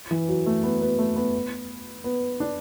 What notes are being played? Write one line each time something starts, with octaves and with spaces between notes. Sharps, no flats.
E3
F#3
A3
B3
B3
A3
B3
B3
D4